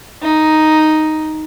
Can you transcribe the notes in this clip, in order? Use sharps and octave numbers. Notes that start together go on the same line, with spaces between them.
D#4